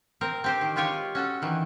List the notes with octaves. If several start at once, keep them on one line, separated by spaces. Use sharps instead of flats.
C4 A#4
C4 G4 C5
D#3
G#3 F4 G4 C#5 G#5
C#4 F#4 A4
D#3 E3